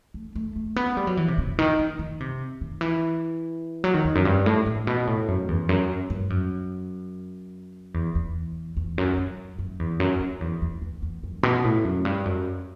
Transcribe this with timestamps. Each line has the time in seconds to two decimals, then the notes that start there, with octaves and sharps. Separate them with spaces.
0.14 A3
0.36 A3
0.56 A3
0.76 B3
0.97 G3
1.07 F#3
1.17 E3
1.28 C3
1.38 C3
1.59 D#3
1.79 D#3
1.99 D#3
2.20 C3
2.61 D#3
2.81 E3
3.84 F#3
3.94 D#3
4.05 E2
4.15 F#2
4.25 G2
4.46 A2
4.66 A2
4.87 B2
5.07 A2
5.28 F#2
5.48 E2
5.69 F#2
6.10 G2
6.30 F#2
7.94 E2
8.15 E2
8.77 E2
8.98 F#2
9.17 F#2
9.59 F#2
9.80 E2
10.00 F#2
10.20 F#2
10.41 E2
10.62 E2
10.82 E2
11.02 E2
11.24 F#2
11.43 B2
11.64 A2
11.85 F#2
12.05 G2
12.26 F#2